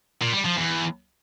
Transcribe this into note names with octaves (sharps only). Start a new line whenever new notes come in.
A#2
G3
F3
E2